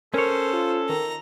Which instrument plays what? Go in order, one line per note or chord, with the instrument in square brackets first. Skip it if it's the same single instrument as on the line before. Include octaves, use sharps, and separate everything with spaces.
[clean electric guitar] C#4 C#5 [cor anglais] A4 [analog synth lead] A#4 [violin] C5
[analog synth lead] F4
[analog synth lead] D#3 [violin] A#5